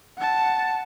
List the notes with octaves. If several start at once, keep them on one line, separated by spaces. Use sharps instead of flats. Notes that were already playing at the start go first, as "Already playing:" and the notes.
F#5 A5